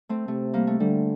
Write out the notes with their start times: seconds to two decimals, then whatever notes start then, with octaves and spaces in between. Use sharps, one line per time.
0.09 A3 C4
0.27 C3 A3
0.54 G3 A#3
0.67 A3
0.80 D3 G3